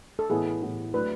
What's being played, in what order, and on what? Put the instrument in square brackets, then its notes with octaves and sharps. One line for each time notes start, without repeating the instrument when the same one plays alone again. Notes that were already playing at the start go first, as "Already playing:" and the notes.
[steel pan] A4
[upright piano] A2 E3 B3 E4 [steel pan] G#4
[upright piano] A2 E3 B3 E4
[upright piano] F#3 A3 D4 [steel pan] B4